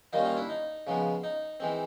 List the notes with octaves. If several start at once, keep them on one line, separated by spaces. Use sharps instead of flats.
D#3 G3 A#3 C#4 D#4 F4
D#4 F4
D4 E4
D#4
C#3 F3 G#3 B3
D#4
E3 G#3 C4